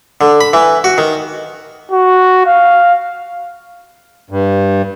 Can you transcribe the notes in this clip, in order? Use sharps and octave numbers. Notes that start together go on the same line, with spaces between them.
D3
B5
E3
F#4
D#3
F#4
F5
G2